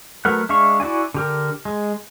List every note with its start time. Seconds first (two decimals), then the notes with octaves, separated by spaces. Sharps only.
0.25 F#3 A3 A#4 B4 F#5
0.49 G#3 D4 E5 F5 C#6
0.80 E4 F#4 D5 G#5
1.14 D3 G4 A#4
1.65 G#3